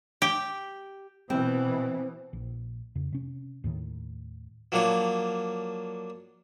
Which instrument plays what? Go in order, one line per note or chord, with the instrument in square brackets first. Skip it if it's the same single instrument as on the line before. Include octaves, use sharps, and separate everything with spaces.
[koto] G4
[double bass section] B2 E3 [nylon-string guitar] C4
[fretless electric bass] A#1
F2 C#3
C3 C#4
D#2 A2 D#3
[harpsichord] F3 F#3 A#3 D4 C#5